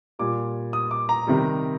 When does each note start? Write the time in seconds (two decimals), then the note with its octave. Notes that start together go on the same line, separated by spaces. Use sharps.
0.19 A#2 G3 D6
0.73 D#6
0.91 D6
1.09 A#5
1.27 C3 D#3 G3